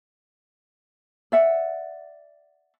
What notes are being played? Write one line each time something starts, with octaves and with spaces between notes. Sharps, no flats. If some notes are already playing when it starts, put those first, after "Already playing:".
D5 E5 F#5